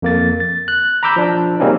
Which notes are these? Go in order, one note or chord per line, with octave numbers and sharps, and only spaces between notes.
F2 A#3 A6
A6
F#6
A#5 B5 D6 E6 G6
F3 D4
C#3 G3 A#3 C4 C#4 D#4